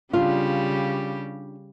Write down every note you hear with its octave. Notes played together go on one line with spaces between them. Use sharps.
C#3 G3 D4 F4 G4